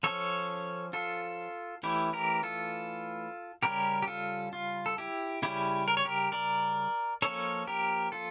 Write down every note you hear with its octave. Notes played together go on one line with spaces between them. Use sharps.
F3 C#4 A4 C#5
F4 A4
E3 A3 C#4 E4 G4
G4 A#4
F4 A4
C#3 G3 C#4 G4 A#4
G4
F4 A4
F4
A4
E4 G4
C#3 G3 C#4 E4 G4
A#4
C#5
G4 A#4
A#4 D5
F3 A#3 C#4 A4 C#5
G4 A#4
F4 A4